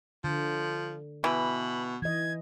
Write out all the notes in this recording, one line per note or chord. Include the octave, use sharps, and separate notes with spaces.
D3 F3
B2 E3 B5
E3 D#5 G#6